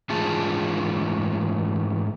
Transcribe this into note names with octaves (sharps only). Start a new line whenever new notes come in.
G#2 E3 A3 F4 G#4 A5